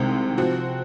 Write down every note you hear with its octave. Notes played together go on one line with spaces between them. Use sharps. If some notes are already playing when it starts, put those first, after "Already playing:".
Already playing: C2 C3 D#3 G#3
F3 C4 F#4